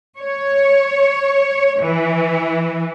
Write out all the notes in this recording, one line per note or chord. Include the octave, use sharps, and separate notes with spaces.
C#5
E3